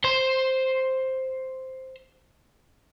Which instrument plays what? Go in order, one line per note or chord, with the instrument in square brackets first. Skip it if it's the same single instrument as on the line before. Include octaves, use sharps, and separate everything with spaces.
[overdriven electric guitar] C5 C6